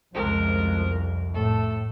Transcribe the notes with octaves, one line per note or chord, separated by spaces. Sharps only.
C2 F2 C#3 F3 G#3 A#4
A2 A3 A4